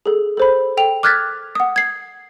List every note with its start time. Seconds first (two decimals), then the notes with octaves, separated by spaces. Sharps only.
0.06 G#4 A4
0.37 A4 C5 B5
0.77 A4 G5 F7
1.03 D6 F6 F#6 G#6 A6 B6
1.55 F#5 D#6
1.76 G#6 C7